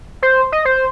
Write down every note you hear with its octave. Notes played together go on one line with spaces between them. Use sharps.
C5
D#5
C5